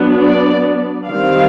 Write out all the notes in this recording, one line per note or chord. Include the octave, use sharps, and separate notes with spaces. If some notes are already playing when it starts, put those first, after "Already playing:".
Already playing: F#3 B3 D4
D5
D#3 G3 C4 F5